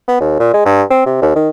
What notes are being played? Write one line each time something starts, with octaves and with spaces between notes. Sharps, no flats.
B3
D#2
A#2
G#3
G2
C4
C3
D#2
D#3